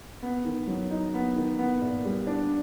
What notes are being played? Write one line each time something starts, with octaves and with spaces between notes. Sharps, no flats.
B3
D#3
F#3
D#4
B3
D#3
B3
A#2
G3
D4